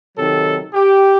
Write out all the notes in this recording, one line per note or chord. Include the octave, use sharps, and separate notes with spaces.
C3 D#3 F#3 A4
G4